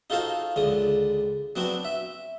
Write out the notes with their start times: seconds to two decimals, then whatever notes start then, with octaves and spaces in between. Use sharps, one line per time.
0.10 D#4 F4 F#4 A4 C5 F5
0.56 C#2 D3 D#6
1.56 F#3 B3 C4 D4 F#4
1.85 E5